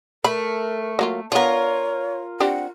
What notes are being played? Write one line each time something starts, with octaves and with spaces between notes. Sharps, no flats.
A3 A#4 B5
F#3 A#3 F4
B3 D4 F4 A#4 C#5
C4 D4 G4 F#5